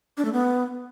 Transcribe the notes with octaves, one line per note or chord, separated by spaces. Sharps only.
D4
A3
B3